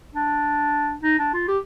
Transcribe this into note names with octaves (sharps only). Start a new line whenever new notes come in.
D4
D#4
D4
F4
G4